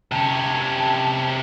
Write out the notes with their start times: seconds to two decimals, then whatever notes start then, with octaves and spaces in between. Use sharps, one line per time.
0.12 C3 C#4 A5